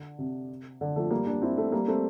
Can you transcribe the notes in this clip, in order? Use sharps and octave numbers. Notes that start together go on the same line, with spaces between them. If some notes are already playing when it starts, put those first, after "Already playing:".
Already playing: D3
C3
D3
F3 A3
G3 A#3
A#3 D4
C4 E4
A3 C4
G3 A#3
A3 C4